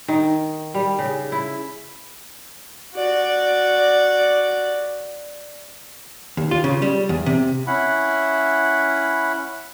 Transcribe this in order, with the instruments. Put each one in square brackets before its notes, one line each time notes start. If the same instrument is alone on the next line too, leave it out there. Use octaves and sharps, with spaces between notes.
[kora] D#3
G3
C#3
E4
[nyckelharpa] F#4 D5
[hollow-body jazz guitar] D#2
F4
C#3
G3
E2
C3
[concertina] C#4 E4 F#5 B5